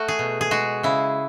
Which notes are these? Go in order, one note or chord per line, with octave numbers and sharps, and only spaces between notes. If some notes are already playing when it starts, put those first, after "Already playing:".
Already playing: A3 F#4
G#4
B2
G#4
G#3 F#4
C#3 E4